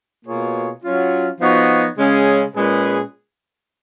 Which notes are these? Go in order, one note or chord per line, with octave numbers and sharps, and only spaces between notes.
B2 A#3 F4 G#4 C#5
F#3 C#4 F4
F3 B3 D#4 F#4 C#5
C#3 G#3 C#4 G#4
A#2 G#3 C#4 G#4 B4